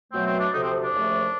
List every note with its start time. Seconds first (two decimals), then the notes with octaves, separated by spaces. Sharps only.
0.12 B2 F#3 A3 C4
0.26 C4
0.39 D4
0.53 D2 C3 F3 D#4
0.63 C4
0.83 D4
0.94 D#2 C#3 F3 A3